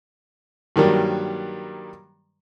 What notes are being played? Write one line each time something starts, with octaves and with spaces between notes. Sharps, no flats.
G2 D#3 F#3 G3 A#3